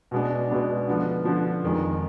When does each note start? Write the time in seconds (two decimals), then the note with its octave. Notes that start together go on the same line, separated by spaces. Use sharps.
0.11 B2 G#3 B3 D4
0.50 B2 G#3 B3 D4
0.87 D3 F3 B3
1.25 D3 F3 B3
1.63 F2 D#3 G#3